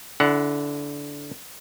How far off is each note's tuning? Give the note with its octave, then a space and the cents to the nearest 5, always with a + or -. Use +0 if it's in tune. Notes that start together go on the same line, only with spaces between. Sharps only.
D3 -20 E4 +0 F#5 +10